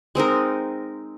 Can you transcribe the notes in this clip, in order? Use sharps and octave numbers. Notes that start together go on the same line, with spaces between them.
G#3 C4 D#4 A#4